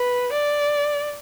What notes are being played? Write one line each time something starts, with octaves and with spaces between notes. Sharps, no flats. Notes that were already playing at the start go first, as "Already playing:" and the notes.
Already playing: B4
D5